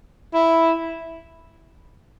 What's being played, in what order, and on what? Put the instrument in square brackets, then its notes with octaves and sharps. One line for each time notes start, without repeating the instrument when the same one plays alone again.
[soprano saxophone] E4